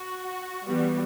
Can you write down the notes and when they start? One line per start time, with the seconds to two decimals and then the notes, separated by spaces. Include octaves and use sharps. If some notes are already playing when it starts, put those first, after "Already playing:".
Already playing: F#4
0.66 E3 G3 B3